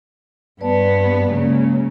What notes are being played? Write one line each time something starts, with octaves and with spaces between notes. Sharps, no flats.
G2 B3 B4 D5 A5
C#3 F#3 G#3 A#3